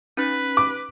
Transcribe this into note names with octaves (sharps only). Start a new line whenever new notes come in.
C#4 D#4 B4
D6